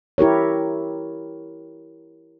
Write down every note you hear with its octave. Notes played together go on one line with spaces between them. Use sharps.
E4 G4 A#4 C#5